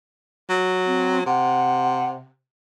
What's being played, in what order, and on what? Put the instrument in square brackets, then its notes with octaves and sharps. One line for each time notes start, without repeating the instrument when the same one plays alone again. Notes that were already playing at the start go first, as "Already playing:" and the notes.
[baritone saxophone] F#3
[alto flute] C4
[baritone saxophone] C3 [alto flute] F#5